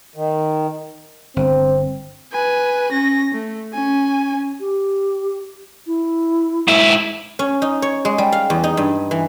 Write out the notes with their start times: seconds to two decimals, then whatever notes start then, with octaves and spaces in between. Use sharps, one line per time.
0.16 D#3
1.36 G1 C4
2.32 B4 G#5
2.92 C#4 A#6
3.34 A3
3.73 C#4 G#5
4.60 G4
5.87 E4
6.68 G#2 E4
7.39 C#4
7.62 D#4
7.82 C#5
8.05 G#3
8.18 G3
8.32 F5
8.50 E2
8.64 D#4
8.77 G2
9.11 E3